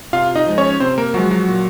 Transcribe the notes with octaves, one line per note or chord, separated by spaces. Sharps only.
C3 F4 F5
D#4 D#5
F3 G#3
C#4 C#5
C3 C4 C5
A#3 A#4
F3 F#3 G#3 F#4
F#3 F#4
A#2